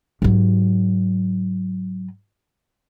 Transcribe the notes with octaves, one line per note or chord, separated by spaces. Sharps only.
G#2 F#3